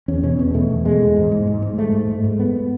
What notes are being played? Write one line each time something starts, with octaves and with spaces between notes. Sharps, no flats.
E2 C#4
B2 C#4
E2 B3
B2 A3
E2
B2 G#3
E2
G#2
G#2
G#2
G#2
G#2 A3
G#2
G#2
G#2
G#2 B3